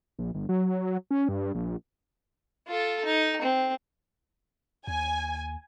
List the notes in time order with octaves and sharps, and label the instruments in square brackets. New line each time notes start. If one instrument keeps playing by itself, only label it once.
[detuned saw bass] A#1
G1
F#3
C#4
G2
A#1
[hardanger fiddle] F4 A4
D#4
C4
[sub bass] D#2 [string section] G#5